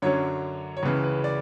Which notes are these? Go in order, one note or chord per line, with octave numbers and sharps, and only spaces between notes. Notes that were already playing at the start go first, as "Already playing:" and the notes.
F#2 D3 F#3 C#4 C#5
C#5
C#2 C#3 E3 B4
B4
D5